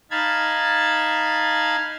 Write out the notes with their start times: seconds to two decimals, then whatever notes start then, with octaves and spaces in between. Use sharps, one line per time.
0.11 D#4 F5 A5 B5 G#6 A6